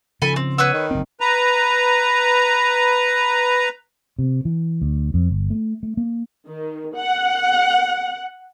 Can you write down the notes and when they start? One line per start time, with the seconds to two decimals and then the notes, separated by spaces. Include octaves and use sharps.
0.22 C#3 F3 A4 G#5 B5
0.36 C4
0.58 B3 B4 C#5 E6
0.73 D#3
0.91 F#1 C4
1.21 B4 A#5
4.19 C3
4.45 E3
4.82 D2
5.14 F2
5.30 G1
5.50 A3
5.83 A3
5.97 A#3
6.47 D#3
6.96 F#5